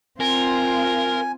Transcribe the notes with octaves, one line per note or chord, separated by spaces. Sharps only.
C4 F4 A#4 G#5